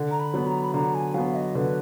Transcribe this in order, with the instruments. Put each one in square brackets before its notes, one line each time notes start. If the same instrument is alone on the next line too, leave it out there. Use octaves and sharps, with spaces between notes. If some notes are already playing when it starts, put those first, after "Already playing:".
Already playing: [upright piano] D3
[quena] A#5
B5
[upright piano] F#3 B3
[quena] A#5
B5
[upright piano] D3 [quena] A#5
[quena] G#5
[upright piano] F#3 B3 [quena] F5
[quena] D#5
[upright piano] D3 [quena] B4